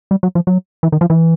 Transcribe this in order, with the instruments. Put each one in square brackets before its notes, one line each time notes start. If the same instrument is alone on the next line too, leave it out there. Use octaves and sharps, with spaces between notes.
[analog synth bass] G3
F#3
F3
F#3
E3
D#3
F3
E3